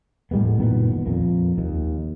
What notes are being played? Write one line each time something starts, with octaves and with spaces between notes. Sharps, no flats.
A2 G3 G#3 B3
F#1 A#2 D#3 B3
F2 A#2
D#2